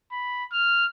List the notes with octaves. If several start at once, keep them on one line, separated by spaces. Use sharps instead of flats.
B5
F6